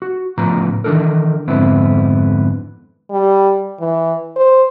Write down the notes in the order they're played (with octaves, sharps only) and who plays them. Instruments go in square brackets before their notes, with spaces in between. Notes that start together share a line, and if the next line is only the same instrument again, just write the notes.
[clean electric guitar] F#4
A2 C#3 F3 B3 A#5
D#3 E3 C#4 D4 A4 A#4
F2 G#2 D3 B3 C4 E4
[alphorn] G3
E3
C5